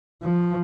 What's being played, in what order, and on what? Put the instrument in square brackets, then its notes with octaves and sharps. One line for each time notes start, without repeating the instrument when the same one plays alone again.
[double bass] F3